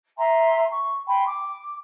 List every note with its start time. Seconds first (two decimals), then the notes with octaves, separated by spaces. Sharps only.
0.18 E5 G#5 A#5 C6
0.71 C#6
1.06 G5 G#5 B5 C6
1.26 D6